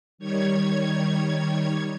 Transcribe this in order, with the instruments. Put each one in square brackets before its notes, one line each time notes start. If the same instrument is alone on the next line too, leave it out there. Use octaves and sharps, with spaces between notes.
[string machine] D#3 G3 C#5 G#6